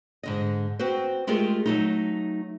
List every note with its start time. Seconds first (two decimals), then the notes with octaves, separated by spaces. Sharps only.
0.23 G#2 D3 D#5
0.79 C4 F#4 B4 C5
1.27 G#3 A3 F4 G4 G#4 A#4
1.66 F#3 A3 D#4